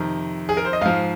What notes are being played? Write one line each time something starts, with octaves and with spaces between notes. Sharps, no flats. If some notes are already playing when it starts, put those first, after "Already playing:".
Already playing: F2 C3 D#3 A#5
G#4
A#4
C5
D#5
G#2 F3 F5